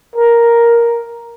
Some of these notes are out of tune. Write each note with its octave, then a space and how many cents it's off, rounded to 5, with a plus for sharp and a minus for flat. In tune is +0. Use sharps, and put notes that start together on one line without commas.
A#4 +5